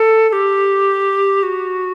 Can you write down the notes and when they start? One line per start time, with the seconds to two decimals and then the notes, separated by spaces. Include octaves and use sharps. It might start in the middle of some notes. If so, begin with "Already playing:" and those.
Already playing: A4
0.29 A4
0.33 G4
1.43 F#4